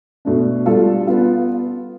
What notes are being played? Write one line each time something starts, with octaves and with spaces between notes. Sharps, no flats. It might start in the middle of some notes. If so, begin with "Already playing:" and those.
B2 A3 D4
G3 D4 F4 A4
B3 F4